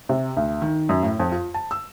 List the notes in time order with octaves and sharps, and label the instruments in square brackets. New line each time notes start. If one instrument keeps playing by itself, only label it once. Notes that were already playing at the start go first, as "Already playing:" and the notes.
[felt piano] C3
D2
D#3
F#2
A2
F2
F4
A5
E6